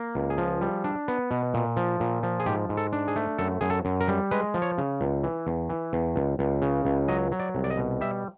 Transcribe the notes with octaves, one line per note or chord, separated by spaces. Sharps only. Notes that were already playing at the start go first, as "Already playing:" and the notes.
Already playing: A#3
C#2
G#4
F3
G3
D4
B3
B2
A#2
F3
A#2
F3
G#4
G#2 G4
G#2
A4
D4
G#4
A3
F#2 A4
F#2 G#4
A4
F#2
A#4
G3
G#3 B4
F3
C#5
C#3
C#2
E3
E2
E3
E2
C#2
C#2
C#3
C#2
F#3 D#5
F#3
D5
C2
D5
D#5
B2
G3 E5